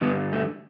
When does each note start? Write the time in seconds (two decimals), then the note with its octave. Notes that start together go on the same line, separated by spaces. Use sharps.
0.01 G2 D3 G3 B3
0.33 A3